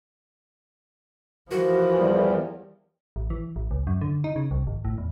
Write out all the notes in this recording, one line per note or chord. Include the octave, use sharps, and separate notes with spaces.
E3 F3 F#4 A#4
E2 G3
A1
E3
A1
C#2
F#2
D3
D#4
C#3
C2
G#1
A2
E2